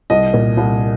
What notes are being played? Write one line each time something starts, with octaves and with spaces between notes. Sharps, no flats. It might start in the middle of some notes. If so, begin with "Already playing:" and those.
C2 D#5
A#2
C2